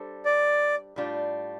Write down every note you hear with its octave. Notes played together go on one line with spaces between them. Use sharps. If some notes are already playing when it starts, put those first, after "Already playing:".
Already playing: G3 D4 A4 C5
D5
A2 G3 D4 F4